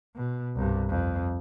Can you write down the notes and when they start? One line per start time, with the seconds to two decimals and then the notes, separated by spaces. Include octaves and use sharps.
0.16 B2
0.56 C2 G2
0.89 F2